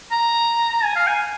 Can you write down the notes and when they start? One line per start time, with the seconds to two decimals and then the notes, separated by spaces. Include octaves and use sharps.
0.11 A#5
0.72 A#5
0.84 G#5
0.96 F5
1.07 G#5